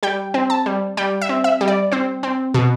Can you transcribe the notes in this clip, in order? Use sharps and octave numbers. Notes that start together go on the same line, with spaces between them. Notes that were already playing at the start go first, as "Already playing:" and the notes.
G3 G5
C4
A5
G3
G3 G5
E5
C4
E5
G3
D5
C4 C5
C4
B2